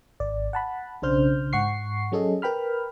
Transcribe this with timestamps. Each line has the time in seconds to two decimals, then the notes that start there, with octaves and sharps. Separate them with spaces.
0.20 G#1 D5
0.53 F#5 A5 B5
1.02 B1 C#3 D4 C5 F6 G6
1.53 G#2 F#5 C#6 C7
2.12 F#3 C#4 G#4 A4 D#5
2.42 A#4 B4 G5 B5 F6